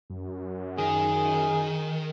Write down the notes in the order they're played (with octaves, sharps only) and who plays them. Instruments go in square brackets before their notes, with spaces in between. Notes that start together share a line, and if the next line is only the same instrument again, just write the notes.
[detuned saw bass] F#2
[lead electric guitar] D#3 [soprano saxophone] G#4